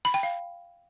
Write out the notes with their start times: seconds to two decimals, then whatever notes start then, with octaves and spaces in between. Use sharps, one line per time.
0.05 B5
0.14 G5
0.23 F5